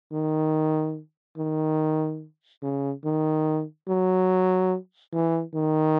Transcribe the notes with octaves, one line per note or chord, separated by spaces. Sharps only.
D#3
D#3
C#3
D#3
F#3
E3
D#3